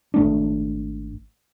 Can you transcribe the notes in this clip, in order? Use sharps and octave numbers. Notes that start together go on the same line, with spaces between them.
G#1 A3 D4